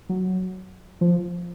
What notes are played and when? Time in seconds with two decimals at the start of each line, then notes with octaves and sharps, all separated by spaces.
0.09 F#3
1.01 F3